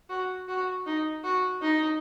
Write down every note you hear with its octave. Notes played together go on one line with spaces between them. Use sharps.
F#4
F#4
D#4
F#4
D#4